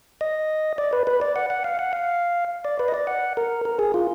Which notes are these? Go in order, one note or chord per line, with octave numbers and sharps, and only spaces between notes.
D#5
D5
B4
B4
D5
F#5
F#5
F5
F#5
F5
D5
B4
D#5
D5
F#5
A#4
A#4
G#4
F4